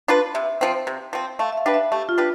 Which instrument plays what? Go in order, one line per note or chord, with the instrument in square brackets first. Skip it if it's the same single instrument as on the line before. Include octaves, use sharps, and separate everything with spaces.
[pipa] D4 F4 B4
[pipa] C3 [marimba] E5
[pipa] F3 C4
C3
F3 C4
[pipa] A3 [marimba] F5
[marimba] E5
F5
[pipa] D4 G4 B4
[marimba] E5
[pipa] A3 [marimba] G4
[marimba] F4
[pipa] D4 G4 B4